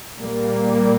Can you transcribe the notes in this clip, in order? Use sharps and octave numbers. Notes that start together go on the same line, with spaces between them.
A#2 G3 A#3